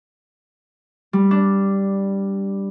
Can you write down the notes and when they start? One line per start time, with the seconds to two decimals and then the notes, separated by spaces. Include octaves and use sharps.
1.13 G3
1.31 D4